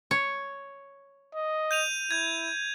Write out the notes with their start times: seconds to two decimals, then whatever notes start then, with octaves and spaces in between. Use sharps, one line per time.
0.11 C#5
1.35 D#5
1.71 G6 D#7 F7
2.11 E4 G6 G#6